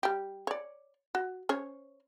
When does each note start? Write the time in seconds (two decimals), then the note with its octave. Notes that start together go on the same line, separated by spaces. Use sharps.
0.03 G3 G4
0.47 C#5 D5
1.15 F#4
1.49 C#4 C5 C#5